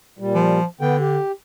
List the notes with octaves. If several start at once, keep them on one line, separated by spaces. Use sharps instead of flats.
A#2 G3
F3
D3 B3 G5
G4